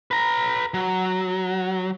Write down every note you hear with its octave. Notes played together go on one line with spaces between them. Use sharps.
B4 A#5
F#3